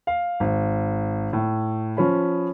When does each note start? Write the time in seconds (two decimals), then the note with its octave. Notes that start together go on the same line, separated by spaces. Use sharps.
0.07 F5
0.40 G#1
1.33 A2
1.97 F3 C#4 B5